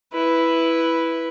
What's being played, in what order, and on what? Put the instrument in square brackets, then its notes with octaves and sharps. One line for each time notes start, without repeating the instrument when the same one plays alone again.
[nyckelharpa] E4 B4